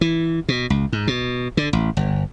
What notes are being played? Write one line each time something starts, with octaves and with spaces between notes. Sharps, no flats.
E3
B2
C#2
G#2
B2
D3
A1
G1